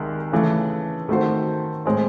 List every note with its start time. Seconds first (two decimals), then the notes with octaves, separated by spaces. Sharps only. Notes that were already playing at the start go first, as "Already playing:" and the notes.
Already playing: C2 D#3 G#3
0.32 C#3 E3 A3
1.09 D#3 A3 C4 F#4 C5
1.86 A2 G#3 C4